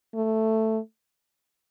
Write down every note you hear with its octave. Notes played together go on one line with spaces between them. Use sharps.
A3